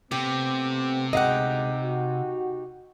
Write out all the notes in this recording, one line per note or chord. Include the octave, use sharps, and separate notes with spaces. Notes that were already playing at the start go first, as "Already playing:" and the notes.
C3 A3 B3 C4 G4
D2 B2 G#3 D#4 G4 D#5 F5 F#5
F#4